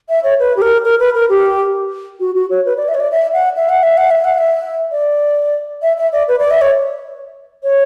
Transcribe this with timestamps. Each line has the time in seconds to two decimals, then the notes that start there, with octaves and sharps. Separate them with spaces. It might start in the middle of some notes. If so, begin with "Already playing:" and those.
0.09 E5
0.24 C#5
0.39 B4
0.57 G4
0.62 A#4
0.85 A#4
0.99 B4
1.15 A#4
1.29 G4
2.20 F#4
2.35 F#4
2.50 C#5
2.66 B4
2.77 D5
2.88 E5
2.94 C#5
3.00 D5
3.11 E5
3.33 F#5
3.56 E5
3.69 F#5
3.83 E5
3.97 F#5
4.11 E5
4.24 F#5
4.38 E5
4.92 D5
5.82 E5
5.98 E5
6.13 D5
6.28 B4
6.39 D5
6.51 E5
6.61 C#5
7.63 C#5